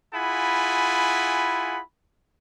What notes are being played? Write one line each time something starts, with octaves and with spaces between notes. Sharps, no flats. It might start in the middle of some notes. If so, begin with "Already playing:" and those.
E4 F4 G#4 F#5 G#5 B5